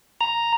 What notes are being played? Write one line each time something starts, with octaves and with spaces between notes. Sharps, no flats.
A#5